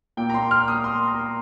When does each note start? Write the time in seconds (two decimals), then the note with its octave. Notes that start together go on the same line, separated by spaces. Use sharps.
0.17 A#2 A#3 G5
0.30 A#5
0.34 C6
0.51 F6
0.68 D#6
0.84 C6
1.08 A#5